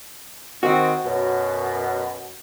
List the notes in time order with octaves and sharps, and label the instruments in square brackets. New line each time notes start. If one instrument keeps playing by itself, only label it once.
[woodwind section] D#3 C4 [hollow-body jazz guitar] F#4
[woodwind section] F#2 B2